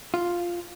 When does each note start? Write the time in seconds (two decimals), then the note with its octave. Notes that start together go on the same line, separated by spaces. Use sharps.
0.14 F4